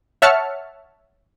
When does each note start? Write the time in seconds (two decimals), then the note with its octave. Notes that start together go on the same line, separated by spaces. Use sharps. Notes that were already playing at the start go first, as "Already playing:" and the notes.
0.22 C#5 E5 F#5 A5 F6 C#7